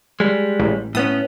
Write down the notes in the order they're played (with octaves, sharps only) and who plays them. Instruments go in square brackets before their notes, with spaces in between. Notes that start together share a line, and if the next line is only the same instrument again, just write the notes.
[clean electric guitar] G3 G#3
[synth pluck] A1
[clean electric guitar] A2 B3 C#4 [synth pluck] D#6